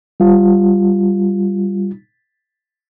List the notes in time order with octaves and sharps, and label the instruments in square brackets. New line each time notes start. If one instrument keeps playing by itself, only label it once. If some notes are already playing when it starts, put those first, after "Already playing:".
[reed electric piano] G3 F4